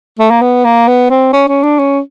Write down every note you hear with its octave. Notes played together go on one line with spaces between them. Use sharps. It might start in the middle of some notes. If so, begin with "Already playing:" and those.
A3
A#3
B3
A#3
B3
C4
C#4
C#4
D4
C#4